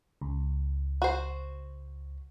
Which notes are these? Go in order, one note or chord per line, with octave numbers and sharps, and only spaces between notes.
C#2
F#4 C5